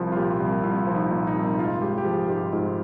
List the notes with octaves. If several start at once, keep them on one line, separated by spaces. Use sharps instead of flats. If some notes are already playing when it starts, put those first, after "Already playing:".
Already playing: C2 F3
F4
A#2 G4
C2
C2 F4
F3
D#4
A#2
D#4
C2
G#2 F4
G#3 G4
G4
F3 G#4
G#2 G4
G#2 F4